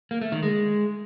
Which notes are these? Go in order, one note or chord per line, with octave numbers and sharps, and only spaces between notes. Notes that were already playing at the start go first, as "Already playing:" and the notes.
A#3
A3
D#3
G#3